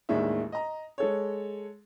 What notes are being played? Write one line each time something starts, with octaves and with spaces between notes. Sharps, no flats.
A1 D#2 D#3 G#3 D4 E5
D#5 A#5
G#3 A4 C#5